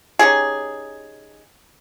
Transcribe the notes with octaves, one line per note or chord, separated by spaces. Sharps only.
C#4 D#4 G4 G#4